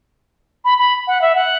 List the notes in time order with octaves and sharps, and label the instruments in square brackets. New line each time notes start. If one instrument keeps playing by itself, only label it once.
[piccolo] B5
B5
F#5
E5
F#5